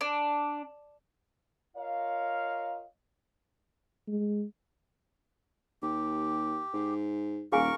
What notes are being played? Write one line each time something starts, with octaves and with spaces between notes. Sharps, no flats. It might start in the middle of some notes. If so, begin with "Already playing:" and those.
D4
F4 A#4 C#5 D#5 F5
G#3
D#2 G4
G#2
D#1 G#4 A#4 F5 G#5 C#6